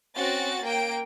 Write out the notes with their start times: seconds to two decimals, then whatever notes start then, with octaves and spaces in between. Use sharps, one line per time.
0.15 C4 C#4 F#4 A6
0.63 A#3 G5 D7